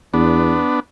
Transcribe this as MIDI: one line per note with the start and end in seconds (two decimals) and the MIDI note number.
0.14 0.61 40
0.14 0.80 59
0.14 0.80 62